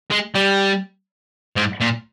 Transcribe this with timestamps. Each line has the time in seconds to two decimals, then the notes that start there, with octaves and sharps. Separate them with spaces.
0.11 G#3
0.35 G3
1.56 G#2
1.80 A#2